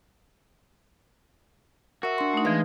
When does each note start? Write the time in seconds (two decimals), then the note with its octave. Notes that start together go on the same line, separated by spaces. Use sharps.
2.03 F#4 A#4 E5
2.18 D4 C6
2.33 A3 D#4
2.45 E3 G#3 B4 F5